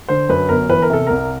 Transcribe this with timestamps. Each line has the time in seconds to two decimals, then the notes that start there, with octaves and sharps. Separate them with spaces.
0.08 D3 C5
0.29 F#2 B4
0.49 G1 A#4
0.69 E3 B4
0.82 A#4
0.90 C3 A4
1.07 C2 A#4